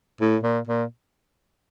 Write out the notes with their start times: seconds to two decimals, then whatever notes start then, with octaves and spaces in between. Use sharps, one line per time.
0.21 A2
0.43 A#2
0.67 A#2